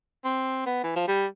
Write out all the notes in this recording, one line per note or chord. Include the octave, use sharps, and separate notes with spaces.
C4
B3
E3
F3
G3